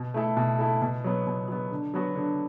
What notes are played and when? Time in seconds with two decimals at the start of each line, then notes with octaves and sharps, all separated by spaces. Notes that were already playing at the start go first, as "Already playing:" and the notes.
Already playing: B2
0.14 A3 E4 A4
0.37 B2
0.59 A3 E4 A4
0.82 B2
1.04 F#3 B3
1.27 B2
1.48 F#3 B3
1.71 D3
1.94 F#3 B3 F#4
2.16 D3